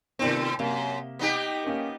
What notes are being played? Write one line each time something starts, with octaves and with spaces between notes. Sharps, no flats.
A2 C3 D#3 B3 C4
F#2 C3 A#3
B3 D#4 G4
A#3 C#4 A#4